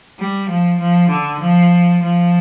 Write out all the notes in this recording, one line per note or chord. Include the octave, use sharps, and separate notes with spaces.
G3
F3
F3
D3
F3
F3